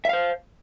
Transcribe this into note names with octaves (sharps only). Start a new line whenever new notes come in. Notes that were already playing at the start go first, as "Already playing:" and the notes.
C5 E5 F5